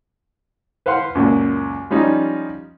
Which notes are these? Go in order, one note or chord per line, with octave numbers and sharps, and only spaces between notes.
B4 C5 F5 F#5 C6
C#2 F#2 A#2
F3 G3 C#4 D#4 F4